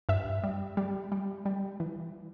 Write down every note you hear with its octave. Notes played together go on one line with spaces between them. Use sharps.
G2 E5
G3
G3
G3
G3
E3